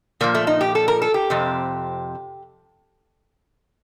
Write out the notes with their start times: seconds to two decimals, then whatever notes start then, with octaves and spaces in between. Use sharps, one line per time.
0.21 A#2 F3 A#3
0.35 A3
0.47 D#4
0.61 G4
0.75 A4
0.88 A#4
1.02 A4
1.14 G4
1.30 F2 C3